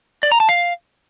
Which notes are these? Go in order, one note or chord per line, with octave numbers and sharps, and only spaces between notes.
D5
A#5
A5
F5